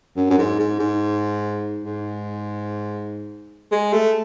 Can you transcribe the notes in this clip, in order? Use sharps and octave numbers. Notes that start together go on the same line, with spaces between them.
F#2
F#2
G#2
G#2
G#2
G#2
G#3
A3